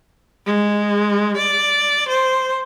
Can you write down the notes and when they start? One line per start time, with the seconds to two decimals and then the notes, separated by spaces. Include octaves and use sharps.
0.46 G#3
1.37 D5
2.09 C5